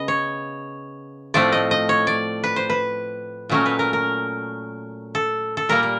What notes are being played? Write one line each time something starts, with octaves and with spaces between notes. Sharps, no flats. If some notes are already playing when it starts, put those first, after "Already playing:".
Already playing: C#3 B3 D#5
C#5
A2 F3 A3 C4 D5
D#5
D#5
C#5
D5
B4
C5
B4
A#2 F#3 A3 C#4 A#4
B4
A#4
A#4
A4
A4
A#2 G3 A#3 A#4
A#4